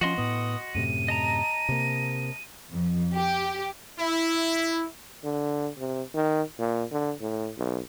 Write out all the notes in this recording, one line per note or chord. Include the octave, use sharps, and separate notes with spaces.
F3 C#4 F#4 D#5 C6
A2 B3 D#6
F#2 A2 C3 D#7
D#5 A5 A#5
C3 A#3
F2
G4
E4
D3
C3
D#3
A#2
D3
A2
B1